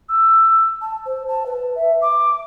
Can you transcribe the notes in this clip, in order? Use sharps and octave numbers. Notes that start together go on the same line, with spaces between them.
E6
A5
C5
A5
B4
E5
D6